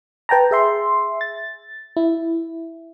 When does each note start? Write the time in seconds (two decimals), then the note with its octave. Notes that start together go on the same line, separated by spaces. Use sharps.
0.29 B4 G5 A5 A#5
0.51 G#4 E5 C6
1.21 A6
1.97 E4